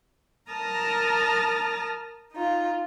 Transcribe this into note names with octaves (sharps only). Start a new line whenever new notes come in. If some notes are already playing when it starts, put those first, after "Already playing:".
A#4 A5 A#5 D#6 F6
D#4 F4